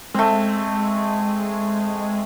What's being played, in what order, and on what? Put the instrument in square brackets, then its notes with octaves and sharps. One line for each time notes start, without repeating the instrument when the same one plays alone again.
[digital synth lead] G#3 [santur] A3 C4